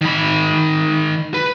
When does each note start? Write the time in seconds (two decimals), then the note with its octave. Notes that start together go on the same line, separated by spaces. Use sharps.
0.01 D#3 B5
1.34 B4